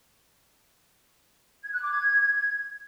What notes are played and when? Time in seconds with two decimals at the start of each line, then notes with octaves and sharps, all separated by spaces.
1.63 G#6
1.72 F#6
1.81 D6
1.91 G#6